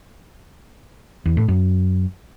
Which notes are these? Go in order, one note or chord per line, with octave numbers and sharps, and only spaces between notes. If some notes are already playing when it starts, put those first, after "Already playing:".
E2
A2
F#2